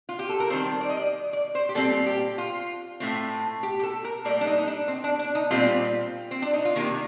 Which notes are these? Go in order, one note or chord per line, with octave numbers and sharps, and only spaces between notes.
F4
G4
A4
A#4
D#3 G3 C4 C5
D5
D#5
D5
D5
C5
G4
A#2 G3 C4 A4
G4
F4
A2 A3 C4
G4
G4
A4
A#4
A2 G3 A#3 D5
D4
D#4
D#4
D4
C4
D4
D4
D#4
A#2 G3 C4 F4
C4
D4
D#4
F4
C3 D#3 A#3 G4